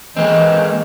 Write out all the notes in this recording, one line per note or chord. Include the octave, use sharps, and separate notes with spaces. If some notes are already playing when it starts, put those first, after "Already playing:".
E3 G#3 A#3 C4 D#5